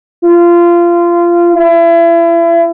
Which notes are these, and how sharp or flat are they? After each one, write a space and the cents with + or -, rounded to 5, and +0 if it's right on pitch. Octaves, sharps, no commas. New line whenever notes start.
F4 -20
E4 +35